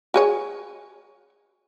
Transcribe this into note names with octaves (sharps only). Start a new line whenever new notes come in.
F#4 G#4 C#5